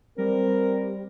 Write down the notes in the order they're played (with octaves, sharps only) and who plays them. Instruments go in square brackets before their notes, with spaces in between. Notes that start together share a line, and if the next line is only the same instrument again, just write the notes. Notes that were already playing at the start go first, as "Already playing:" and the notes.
[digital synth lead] G3 [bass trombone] C4 [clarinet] A#4